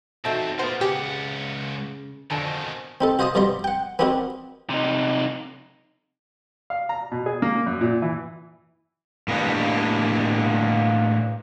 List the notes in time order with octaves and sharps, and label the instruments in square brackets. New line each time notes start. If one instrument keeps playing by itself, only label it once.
[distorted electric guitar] E2 C4 [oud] D#4 F#4 [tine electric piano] A4 E5 A5
[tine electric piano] B3 F#5 [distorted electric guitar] F4 A#4 [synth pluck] C5
[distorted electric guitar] C#2 F#5 [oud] C#3 [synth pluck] G4 [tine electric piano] G#4
[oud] F2 [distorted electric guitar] B2 D#3 [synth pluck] D3 [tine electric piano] G#5 A5
[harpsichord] C4 D#4 A4
F#4 C5 D#5 F5 A5 D#6
G2 B2 D5 A#5 C6
F#5 G5
B3 C4 D4 D#4 F#4 A#4
[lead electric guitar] C3 D#4
[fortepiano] F5
A#5
B2
G#4
A#3
F#2
A#2
E3
[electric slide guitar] A2 A#3 B3 D4 G4